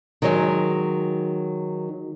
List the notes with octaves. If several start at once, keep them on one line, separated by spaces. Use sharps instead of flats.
D#3 F#3 G#3